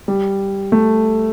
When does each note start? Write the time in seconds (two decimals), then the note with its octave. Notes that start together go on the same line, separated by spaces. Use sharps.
0.08 G3
0.72 A3